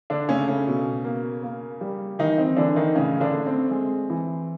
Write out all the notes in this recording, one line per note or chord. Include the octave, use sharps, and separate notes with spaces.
D3 D4
C#3 A3 C#4
C#3 C#4
B2
A#3
A#3
G3
D#3 E3 D#4
C4
D3 E3 D4
D#3 D#4
A2 C#3 C#4
D3 D4
A3
C4
G#3
E3